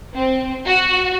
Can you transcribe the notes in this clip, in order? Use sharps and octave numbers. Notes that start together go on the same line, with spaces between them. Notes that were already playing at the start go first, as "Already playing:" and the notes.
C4
F#4